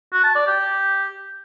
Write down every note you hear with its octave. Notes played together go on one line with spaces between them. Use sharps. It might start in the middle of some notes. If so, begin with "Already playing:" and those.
F#4
A5
D5
G4